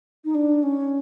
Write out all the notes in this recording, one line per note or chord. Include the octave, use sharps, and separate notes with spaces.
D#4
D4
C#4